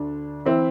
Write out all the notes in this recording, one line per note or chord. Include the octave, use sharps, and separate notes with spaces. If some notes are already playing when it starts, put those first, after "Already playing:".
Already playing: D2 D3 D4
E3 C4 E4